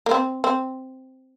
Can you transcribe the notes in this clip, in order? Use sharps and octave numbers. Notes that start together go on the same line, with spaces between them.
A#3
C4
C4